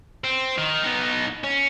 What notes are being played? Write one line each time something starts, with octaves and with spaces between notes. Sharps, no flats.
C4
D#3
B3 D#4
C#4